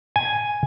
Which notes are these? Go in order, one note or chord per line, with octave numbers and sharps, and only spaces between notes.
G#5